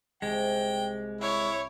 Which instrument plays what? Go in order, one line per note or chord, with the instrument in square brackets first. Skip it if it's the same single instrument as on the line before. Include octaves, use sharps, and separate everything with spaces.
[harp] C2 [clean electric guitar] G#3 [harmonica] G5
[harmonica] E4 [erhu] C#5